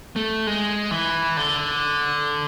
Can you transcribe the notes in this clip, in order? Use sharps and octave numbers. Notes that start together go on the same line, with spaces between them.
A3
G#3
E3
D3